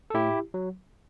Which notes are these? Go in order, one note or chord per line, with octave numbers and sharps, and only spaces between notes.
A4
A2 E4 G4
F#3